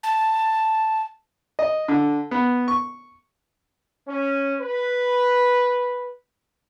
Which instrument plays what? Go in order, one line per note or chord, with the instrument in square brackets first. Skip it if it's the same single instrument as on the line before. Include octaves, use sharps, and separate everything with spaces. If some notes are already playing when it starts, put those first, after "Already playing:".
[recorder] A5
[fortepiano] D#5
D3
B3
C#6
[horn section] C#4
B4